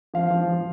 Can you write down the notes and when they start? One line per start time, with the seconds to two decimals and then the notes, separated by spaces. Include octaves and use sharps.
0.14 F3 F5
0.30 F3
0.48 F3